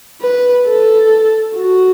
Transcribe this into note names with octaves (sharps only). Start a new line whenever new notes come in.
B4
A4
F#4